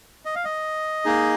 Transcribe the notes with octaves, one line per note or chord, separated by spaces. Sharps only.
D#5
F5
D#5
A#3 D#4 G#4